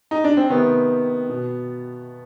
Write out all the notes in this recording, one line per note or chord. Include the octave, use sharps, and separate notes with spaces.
D#4
D4
C4
C3 D#3 B3
B2